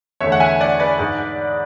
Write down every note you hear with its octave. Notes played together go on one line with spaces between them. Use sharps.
E2 D3 A3 C#5 E5
F#5
E5 G#5
D5 F#5
B4 D5
G#2 G#3